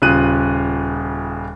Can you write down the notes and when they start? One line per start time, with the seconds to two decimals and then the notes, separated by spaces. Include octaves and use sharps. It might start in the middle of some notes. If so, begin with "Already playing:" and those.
0.02 D#1 C#3 F4 F#6 D#7